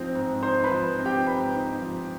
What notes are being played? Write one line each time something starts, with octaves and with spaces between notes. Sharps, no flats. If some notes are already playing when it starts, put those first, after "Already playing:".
Already playing: G#2 F3 C4 D#4
G#2
D#4 C5 C6
B4 B5
F3
C4
G4 G5
G#2 B4 B5
D#4
F3